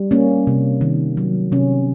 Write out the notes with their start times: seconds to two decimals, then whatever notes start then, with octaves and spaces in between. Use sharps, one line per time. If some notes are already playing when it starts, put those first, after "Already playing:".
Already playing: G3
0.11 A#3 C#4
0.47 C3
0.81 D#3
1.17 F#3
1.52 C3 C#4